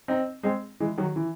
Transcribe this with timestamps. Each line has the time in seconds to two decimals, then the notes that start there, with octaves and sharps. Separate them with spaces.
0.08 C4 D#4
0.43 G#3 C4
0.80 E3 G#3
0.98 D#3 F#3
1.16 E3